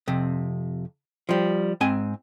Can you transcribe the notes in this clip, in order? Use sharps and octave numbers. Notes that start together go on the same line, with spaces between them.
F2 C3
F3 G3
G#2 C4 G#5